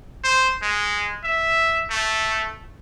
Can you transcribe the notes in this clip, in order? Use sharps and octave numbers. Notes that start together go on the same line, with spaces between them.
C5
G#3
E5
A3